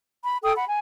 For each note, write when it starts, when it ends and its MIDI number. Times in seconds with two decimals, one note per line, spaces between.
0.24 0.37 83
0.44 0.54 69
0.44 0.54 79
0.44 0.54 87
0.56 0.65 78
0.56 0.65 83
0.68 0.79 80